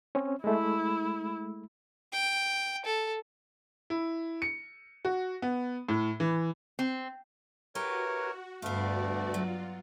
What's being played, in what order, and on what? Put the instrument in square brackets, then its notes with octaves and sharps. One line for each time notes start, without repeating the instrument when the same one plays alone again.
[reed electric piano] C4 C#4
[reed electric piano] G#3 A3 [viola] E4
[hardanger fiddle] G5
A4
[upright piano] E4
C#7
F#4
B3
A2
E3
[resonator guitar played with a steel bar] C4
[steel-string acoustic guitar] E4 G4 B4 [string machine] F#4 [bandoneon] A#4 C#5
[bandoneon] D2 A3 [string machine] G2 F#4 D5 [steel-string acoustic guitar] B3 F5
[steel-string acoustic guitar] F#3 [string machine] F4